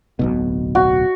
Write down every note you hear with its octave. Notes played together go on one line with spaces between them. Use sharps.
D1 B1 B2
F#4